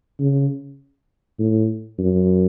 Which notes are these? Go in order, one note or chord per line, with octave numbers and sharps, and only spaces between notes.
C#3
A2
F#2